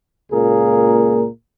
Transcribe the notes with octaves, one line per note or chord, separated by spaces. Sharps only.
C#2 A#2 A#3 G#4 A#4